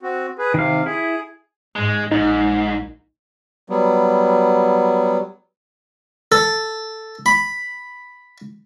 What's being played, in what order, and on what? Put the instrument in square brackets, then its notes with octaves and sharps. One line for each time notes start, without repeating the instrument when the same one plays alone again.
[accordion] C4 F#4
G#4 B4
[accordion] C3 [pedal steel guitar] D#3 F5
[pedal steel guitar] E4 [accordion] G#4
[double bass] G#2 [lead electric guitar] G#3
[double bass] A#1 [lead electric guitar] G#2 [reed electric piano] D#4
[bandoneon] F#3 G3 B3
[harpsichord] A4
B5